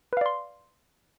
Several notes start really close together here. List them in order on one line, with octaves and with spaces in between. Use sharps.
B4 F5 D5 C6